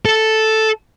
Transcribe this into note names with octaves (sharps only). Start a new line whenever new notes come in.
A4